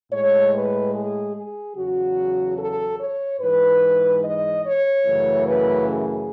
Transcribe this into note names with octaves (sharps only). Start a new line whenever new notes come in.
A2 G#3 C#5
B4
G#4
G#4
E2 C#3 F#3 F#4
A4
C#5
G#2 E3 G#3 B4
D#5
C#5
F#2 C#3 E3 A3
B4
G#4